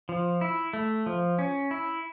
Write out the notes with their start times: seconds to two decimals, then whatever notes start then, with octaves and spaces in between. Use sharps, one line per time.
0.09 F3
0.41 E4
0.73 A3
1.06 F3
1.39 C#4
1.71 E4